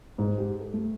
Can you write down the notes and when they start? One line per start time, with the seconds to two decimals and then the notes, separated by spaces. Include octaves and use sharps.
0.18 G#2
0.38 G4
0.60 A4
0.74 A3